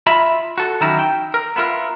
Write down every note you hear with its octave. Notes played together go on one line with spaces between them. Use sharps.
F4 D#5 E5 B5
F#4 A4
D#3 E3 F#3 C#4 D#4 E4
G5
A#4
B3 E4 F4 A#4